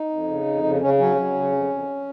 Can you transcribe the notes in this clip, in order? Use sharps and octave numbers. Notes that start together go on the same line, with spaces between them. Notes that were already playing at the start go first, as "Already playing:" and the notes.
Already playing: D#4
F2
C#3
F2
C#3
C#3 C#4
F#3 C#4
F#3
C#3
F2
F2